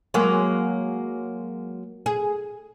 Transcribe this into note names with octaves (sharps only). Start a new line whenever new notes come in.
F#3 G#3 A#3
G#4